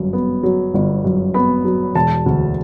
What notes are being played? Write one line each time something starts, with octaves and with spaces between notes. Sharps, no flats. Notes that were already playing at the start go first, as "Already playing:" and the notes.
Already playing: G1 F#2
B3
F#3
G1
F#2
B3 B5
F#3
E1 A5
D2